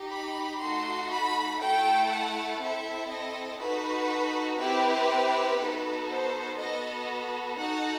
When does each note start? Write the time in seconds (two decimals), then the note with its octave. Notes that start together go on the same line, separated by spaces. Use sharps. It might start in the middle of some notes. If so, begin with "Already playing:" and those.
Already playing: D#4 G4
0.13 B5
0.62 A3 D#4 F#4 A4 C6
1.12 B5
1.61 A3 E4 A4 G5
2.11 F#5
2.61 C4 E4 A4 E5
3.11 D#5
3.61 D#4 F#4 A4 B4
4.60 C4 E4 G4 B4
5.60 B3 D#4 F#4 A4
6.10 C5
6.59 B3 F#4 A4 D#5
7.58 D#4 F#4 A4 F#5